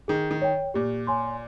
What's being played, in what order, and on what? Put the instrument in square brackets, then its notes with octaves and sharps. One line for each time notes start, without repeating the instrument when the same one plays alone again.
[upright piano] D#3 [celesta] G#4
[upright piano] D#3
[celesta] C#5 G5
[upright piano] A#2 [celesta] G4
[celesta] C#5 G#5 C6